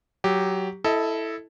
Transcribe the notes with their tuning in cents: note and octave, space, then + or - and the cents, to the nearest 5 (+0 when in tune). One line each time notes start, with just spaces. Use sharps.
F#3 +15 G4 +0
E4 +0 A4 +0 D#5 +25